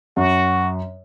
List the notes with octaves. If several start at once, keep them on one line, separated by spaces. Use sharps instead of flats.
F#2 F#4